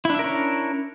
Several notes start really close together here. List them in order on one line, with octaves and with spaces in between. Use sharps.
E4 D4 E5 A#4 C#4